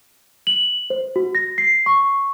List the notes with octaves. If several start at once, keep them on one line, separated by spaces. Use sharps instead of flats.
F#7
C5
F#4
A#6
C7
C#6